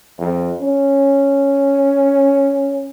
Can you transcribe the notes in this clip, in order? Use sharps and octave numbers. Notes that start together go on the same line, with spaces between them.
F2
C#4